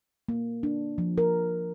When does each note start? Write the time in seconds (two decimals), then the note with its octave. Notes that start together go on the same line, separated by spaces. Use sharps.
0.29 A#3
0.63 D4
0.98 F3
1.18 A#4